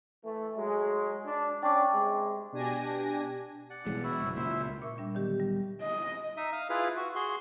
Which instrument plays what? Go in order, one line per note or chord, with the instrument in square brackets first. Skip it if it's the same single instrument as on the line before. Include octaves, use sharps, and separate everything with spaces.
[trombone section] E3 A3
F#3 G#3
D4
[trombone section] C#4 D4 [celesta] G5 C#6 D6
[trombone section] C3 G#3
[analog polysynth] B2 D4 G4 G#5 A#6
[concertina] D5 F#5
[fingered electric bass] B2 E3 G#3
[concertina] E4 F#4
[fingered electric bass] F#1
[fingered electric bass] C#2 A#2 [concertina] E4 C5 E5
[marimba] A#2 A#4 E5 C#6
G3 D4
D3 D#3 F#3 B3 G4
D2 D#3 G3
[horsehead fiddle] D#5
[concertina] D#4 E5 D#6
F5 D#6
E4 F4 G#4 B4 F5
F#4
F#4 G#4 C6